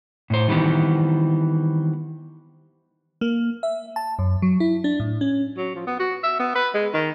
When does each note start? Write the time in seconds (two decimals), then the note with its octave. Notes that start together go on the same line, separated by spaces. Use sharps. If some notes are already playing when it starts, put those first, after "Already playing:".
0.30 A2 C5
0.48 D#3 E3 G3 B3 C4
3.21 A#3
3.63 E5
3.96 A5
4.19 F#2
4.42 F#3
4.60 E4
4.84 D4
5.00 A2
5.21 C#4
5.57 F#3
5.75 F3
5.87 B3
5.99 F#4
6.23 E5
6.39 B3
6.55 B4
6.74 G#3
6.94 D#3